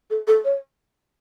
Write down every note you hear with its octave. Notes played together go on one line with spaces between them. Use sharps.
A4
A4
C#5